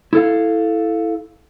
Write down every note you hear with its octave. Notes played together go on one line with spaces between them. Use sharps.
E4 A4 F5